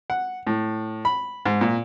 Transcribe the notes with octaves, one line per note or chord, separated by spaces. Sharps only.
F#5
A2
B5
G#2
A#2